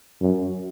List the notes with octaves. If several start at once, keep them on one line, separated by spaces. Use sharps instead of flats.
F#2